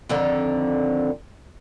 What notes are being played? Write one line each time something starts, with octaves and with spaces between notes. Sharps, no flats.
F2 D3 D#3